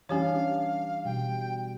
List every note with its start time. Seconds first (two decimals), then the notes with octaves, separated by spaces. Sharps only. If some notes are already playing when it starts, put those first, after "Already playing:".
0.09 E3 G3 C#4 D4 G4 C#5 F5
1.05 B2 G3 G5